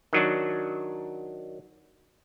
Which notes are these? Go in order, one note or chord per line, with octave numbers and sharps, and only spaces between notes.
D#3 F#3 D4